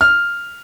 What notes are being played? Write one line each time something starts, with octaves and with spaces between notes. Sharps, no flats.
F6